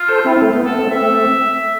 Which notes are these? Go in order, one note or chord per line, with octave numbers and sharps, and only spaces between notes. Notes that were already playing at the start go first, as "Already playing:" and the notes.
Already playing: F4
A4 C5
C4 E4
A3
B3
B3 A4
A3 C4
A3 C4 E5